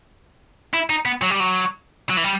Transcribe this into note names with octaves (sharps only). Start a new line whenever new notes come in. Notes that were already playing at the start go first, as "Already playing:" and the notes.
E4
D#4
B3
F#3
G3
F#3
F#3
E3
G3